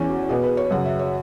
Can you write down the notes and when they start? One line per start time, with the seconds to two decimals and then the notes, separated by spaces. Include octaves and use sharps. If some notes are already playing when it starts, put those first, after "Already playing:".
Already playing: E2 E3 C#4
0.09 F#4
0.29 B2 B3 G#4
0.44 B4
0.57 C#5
0.71 F#2 C#3 F#3 F#5
0.85 E5
0.99 C#5